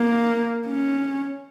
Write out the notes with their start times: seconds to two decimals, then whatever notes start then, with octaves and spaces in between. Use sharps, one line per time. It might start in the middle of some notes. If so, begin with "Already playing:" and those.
Already playing: A#3
0.67 C#4